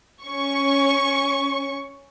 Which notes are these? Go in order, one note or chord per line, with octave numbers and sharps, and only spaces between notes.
C#4 C#6